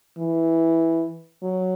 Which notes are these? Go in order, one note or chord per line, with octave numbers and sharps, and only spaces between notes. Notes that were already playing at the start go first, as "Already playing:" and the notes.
E3
F#3